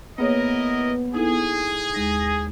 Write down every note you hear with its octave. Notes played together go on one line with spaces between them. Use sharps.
A#3 B3 E4 G#4 A#4 C#5 D#5
D#4 E4 G#4 A4
D#2 G#3 D#4 A#6